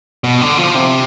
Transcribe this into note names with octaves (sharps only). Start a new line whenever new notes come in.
B2
D3
F3
C3